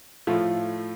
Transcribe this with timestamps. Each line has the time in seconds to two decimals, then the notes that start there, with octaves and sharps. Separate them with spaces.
0.27 A2 F3 A3 F4